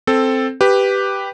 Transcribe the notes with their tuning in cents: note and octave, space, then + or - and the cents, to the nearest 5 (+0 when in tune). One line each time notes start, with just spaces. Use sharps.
C4 +0 A4 +0
G4 +0 B4 +0